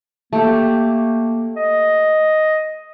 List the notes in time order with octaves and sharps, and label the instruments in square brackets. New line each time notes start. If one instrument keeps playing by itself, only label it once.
[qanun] A3 G4 [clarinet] A#3
[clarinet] D#5